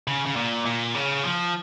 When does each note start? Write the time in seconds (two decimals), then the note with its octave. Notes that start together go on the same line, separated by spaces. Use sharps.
0.08 C#3
0.26 C#3
0.36 A#2
0.65 A#2
0.94 C#3
1.24 F3